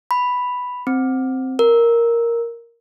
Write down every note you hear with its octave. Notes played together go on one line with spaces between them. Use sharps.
B5
C4
A#4